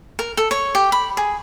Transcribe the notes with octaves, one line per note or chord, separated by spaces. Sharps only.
A#4
A4
C#5
G4
B5
G#4